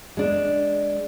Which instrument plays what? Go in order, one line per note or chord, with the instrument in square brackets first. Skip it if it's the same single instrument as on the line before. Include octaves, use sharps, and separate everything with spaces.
[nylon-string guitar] G#3 D4